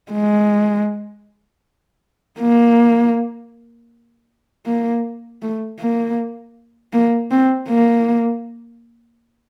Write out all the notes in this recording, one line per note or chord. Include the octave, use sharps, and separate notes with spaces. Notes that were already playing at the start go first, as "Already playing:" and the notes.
G#3
A#3
A#3
A3
A#3
A#3
C4
A#3